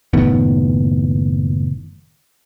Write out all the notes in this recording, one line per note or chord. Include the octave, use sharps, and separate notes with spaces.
F#1 A2 D#3 B3